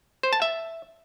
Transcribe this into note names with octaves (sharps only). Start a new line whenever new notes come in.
C5
A5
E5